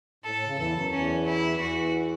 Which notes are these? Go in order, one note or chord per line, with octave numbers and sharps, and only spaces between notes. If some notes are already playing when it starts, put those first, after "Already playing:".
A2 A4
A2
C#3
E2 E3 A4
F#2 F#3
E2 E3 C#4
E4
E2 E3 F#4